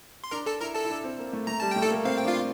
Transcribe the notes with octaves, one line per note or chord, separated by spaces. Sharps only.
C6
D4 A#4 A#5
A4 A5
E4 A#4 A#5
A4 A5
E4
D4
C4
A#3
A3
A3 A#5
G3 A5
A3 G5
A4 A5
A3
A#3
C4 F5
G5
D4 F4 F5